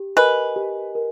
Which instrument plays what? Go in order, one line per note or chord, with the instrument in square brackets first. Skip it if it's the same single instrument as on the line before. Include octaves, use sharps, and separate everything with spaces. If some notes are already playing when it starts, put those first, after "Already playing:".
Already playing: [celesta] G4
[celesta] A#4 D#5 G#5 [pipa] B4
[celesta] G4
A#4